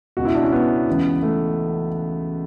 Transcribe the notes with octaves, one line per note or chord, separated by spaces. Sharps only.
C#2 B2 F#4
E4
D4
C#4
B3
C#2 C#3 E3
A3